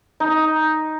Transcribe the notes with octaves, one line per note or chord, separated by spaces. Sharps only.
D#4